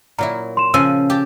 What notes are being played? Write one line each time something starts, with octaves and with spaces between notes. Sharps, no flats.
A#2 F#3 E4 A#5
C6 E7
C#3 F3 G#5 E6
G4 A5